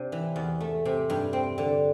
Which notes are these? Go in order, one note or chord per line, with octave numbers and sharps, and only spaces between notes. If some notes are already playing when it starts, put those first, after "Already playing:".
Already playing: C3 D4
E3
E2
A3
C3
G2
C4
D3